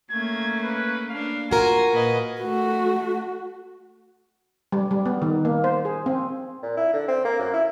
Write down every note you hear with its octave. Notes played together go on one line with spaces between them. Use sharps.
A3 A#3 C#4 G#6
B4
A#3 D4 F5
F4 F#4 A#4 G#5
A#2 B4 D#5
A3 F#4
G3
G3
B3
D#3
A#3
C5
G#4
C4
A#2
E4
D3
C4
A#3
F#2
E4